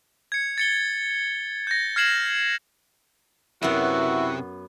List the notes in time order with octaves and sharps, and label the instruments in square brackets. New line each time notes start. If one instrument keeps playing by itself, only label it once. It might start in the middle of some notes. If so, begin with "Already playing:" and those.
[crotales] G#6 C#7
A6 C#7 G7
G6 A#6
F6 G#6 C7 E7 F#7
[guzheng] F#2 B3 [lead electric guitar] C3 [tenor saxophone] E4 [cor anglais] F#4